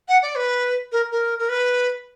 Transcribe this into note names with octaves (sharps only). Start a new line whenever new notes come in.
F#5
D5
B4
A#4
A#4
A#4
B4